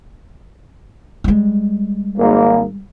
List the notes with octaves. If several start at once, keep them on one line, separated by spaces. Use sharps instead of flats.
G3 G#3
G#1 A#3